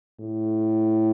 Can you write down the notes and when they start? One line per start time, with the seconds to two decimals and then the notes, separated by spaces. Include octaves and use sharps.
0.20 A2